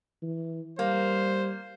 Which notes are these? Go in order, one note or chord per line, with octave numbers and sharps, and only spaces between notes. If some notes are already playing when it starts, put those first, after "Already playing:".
E3
G3 A#3 C5